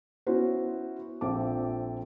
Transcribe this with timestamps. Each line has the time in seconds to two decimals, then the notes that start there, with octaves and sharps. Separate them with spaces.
0.27 B3 C#4 E4 F#4 C5
1.21 A#1 C4 A4 E5 A5 D6